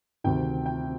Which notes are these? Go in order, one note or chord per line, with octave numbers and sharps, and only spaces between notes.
D2 C3 D#3 G5
G5